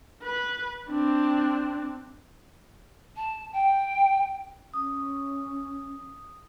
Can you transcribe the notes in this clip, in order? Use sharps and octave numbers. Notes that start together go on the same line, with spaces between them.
B4
C4 D4
A5
G5
C#4 D#6